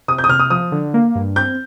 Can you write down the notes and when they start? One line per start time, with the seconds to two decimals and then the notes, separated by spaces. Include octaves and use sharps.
0.08 C3 D#6
0.18 G6
0.24 D#6
0.29 C3 F6
0.39 D#6
0.50 F3 D#6
0.72 D3
0.94 A#3
1.15 G2
1.36 C4 G6